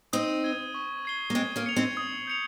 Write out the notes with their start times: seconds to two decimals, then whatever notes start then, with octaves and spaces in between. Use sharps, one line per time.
0.13 C4 D#4 D#6
0.44 G#6 D#7 G7
0.74 C#6
1.05 G#6 C7 G7
1.30 A#3
1.35 G#3 C4 G#6
1.56 A#3 C#4
1.66 C#7 F7
1.76 C4 D#4
1.97 D#6
2.27 G6 C#7 F7